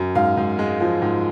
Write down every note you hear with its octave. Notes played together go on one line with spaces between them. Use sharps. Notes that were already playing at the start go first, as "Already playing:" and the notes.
Already playing: F#2
G#2 F5
G#2
G#3
F3
G#2